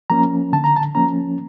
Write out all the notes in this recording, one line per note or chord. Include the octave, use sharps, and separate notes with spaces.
F3 A#3 C#4 A#5
D3 A5
A#5
A5
F3 A#3 C#4 A#5